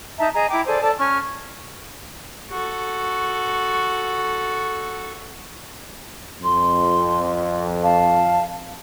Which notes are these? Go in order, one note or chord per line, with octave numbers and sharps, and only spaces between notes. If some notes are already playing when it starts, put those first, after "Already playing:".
D#4 E5 A5 A#5
G#4 D#5 A#5
E4 G5 A#5 D6
G#4 A4 C5 D5
A4 D5 A5
C#4 C#6 F6
F#4 A4
F2 C6
F5 A5